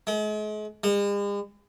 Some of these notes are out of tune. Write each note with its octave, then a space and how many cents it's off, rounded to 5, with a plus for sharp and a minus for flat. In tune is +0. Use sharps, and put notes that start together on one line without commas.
G#3 +40
G#3 -45